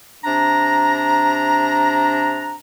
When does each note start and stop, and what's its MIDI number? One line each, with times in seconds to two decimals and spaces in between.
0.24 2.55 48
0.24 2.55 62
0.24 2.55 82